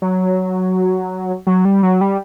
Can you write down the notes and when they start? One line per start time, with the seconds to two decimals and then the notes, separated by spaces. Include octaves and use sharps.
0.02 F#3
1.47 F#3
1.65 G3
1.83 F#3
2.01 G3